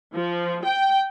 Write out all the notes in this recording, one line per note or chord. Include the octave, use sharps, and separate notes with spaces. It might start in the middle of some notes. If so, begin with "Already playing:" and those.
F3
G5